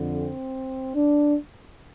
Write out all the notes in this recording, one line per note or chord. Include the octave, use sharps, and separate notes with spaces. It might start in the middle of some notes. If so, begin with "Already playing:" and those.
Already playing: F2 D3
C4
D4